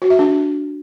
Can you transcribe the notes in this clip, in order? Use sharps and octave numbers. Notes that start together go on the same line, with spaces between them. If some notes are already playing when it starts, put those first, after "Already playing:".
F#4
E5
D4